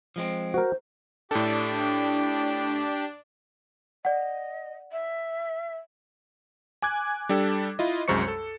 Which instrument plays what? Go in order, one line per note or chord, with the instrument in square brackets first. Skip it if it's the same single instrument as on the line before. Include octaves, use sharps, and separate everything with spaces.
[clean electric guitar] F3 G#3 C4
[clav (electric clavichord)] F#4 A#4 [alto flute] C5
[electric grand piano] A2 A4 [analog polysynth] D4 [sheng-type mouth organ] G4 G5
[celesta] D5 F#5 [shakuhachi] D#5
[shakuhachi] E5
[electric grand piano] G#5 D6 F#6 G#6
G3 D4 G4 A4
E4 F4 D#5
C2 F#2 G#3 C5 C#6 C#7
A4